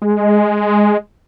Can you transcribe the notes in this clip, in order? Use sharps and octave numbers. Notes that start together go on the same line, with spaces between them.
G#3